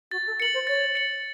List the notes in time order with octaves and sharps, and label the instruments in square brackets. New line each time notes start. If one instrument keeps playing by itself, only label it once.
[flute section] F#4 [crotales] A6
[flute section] A4
[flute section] A#4 [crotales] C#7 F#7
[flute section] C5
[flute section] C#5 [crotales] A6
[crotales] C#7 F#7